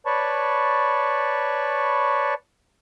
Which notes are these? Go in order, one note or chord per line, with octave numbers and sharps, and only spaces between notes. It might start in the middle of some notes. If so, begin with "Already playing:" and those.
B4 C#5 D5 A5 B5 C#6